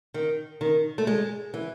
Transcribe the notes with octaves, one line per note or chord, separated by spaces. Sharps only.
D#3
D#3
A3
G#3
E3